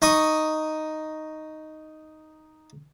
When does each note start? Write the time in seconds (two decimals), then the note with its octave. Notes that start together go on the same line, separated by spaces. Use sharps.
0.02 D#4 C#6 D#6